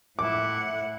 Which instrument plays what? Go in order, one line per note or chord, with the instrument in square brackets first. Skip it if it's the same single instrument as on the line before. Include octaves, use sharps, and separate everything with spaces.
[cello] A2 F#5 [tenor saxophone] E4 [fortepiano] D6